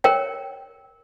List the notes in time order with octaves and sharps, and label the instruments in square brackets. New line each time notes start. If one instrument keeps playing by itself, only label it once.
[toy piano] A#4 C#5 G5